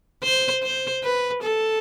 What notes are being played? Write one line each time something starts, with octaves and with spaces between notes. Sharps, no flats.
C5
C5
B4
A4